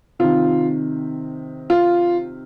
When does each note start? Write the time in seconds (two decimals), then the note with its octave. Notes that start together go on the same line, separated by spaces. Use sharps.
0.19 C3 D#3 F4
1.70 F4